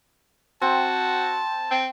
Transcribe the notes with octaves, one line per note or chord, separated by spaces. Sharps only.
C4 F#4 A5
C4